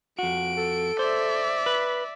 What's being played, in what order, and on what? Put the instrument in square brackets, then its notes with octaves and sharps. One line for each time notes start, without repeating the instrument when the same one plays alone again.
[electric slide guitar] F2 F#4 [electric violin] D7
[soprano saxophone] A4
[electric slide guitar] C5 [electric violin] D5 E5
[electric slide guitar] B4